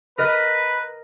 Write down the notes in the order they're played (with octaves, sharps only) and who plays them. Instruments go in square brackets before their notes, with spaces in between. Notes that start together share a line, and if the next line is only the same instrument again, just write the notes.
[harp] A#4 D#5 A#6 [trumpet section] B4